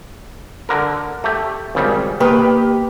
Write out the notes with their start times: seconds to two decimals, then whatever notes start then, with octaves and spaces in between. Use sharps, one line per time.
0.69 D3 A#4
1.24 A3 G4
1.75 G#1 C#3 G3
2.20 D#3 A#3 G4 B4